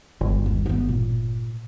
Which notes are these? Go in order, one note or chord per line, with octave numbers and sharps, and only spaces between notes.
G1 G#3
D#2
B3 C4
A#2